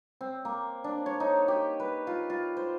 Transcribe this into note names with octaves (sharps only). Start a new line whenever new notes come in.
C4
A#3
D4
C#5
D#4
G4
B4
F4
F4
C5